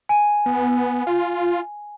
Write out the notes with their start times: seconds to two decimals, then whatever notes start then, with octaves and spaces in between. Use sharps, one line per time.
0.09 G#5
0.46 B3
1.07 F4